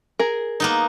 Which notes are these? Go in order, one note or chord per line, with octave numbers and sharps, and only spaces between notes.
G#4 A#4
A#3 B3 D#4